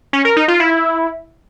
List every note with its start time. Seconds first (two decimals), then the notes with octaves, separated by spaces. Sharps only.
0.13 C#4
0.25 A#4
0.37 D#4
0.48 F4
0.60 E4